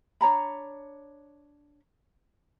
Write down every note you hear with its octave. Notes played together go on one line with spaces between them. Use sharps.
D4 C#5 A#5 B5